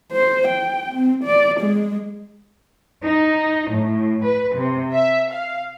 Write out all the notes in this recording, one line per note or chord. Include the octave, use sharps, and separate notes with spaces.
C5
G5
C4
D5
G#3
D#4
A2
B4
C3
E5
F5